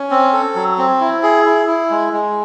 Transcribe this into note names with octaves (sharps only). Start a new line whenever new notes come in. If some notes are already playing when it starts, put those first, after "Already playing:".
Already playing: C#4
C4
A4
F#3
C4
E4
G#4
E4
E4
G#3
G#3